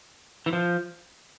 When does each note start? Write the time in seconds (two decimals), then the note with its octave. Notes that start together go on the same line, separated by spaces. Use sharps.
0.46 E3
0.53 F3